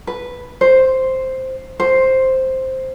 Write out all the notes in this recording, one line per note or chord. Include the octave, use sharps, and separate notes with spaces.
B4
C5
C5